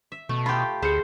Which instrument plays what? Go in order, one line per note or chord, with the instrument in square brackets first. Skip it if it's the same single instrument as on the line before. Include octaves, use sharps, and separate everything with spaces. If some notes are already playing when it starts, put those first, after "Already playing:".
[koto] E5
[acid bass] B2 [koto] A3
[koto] F4 G4 [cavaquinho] G5 B5
[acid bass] D2 [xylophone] G#4 C#7 [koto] C5 F5 [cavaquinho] B5